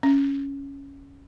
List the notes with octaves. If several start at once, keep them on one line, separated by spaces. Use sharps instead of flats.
C#4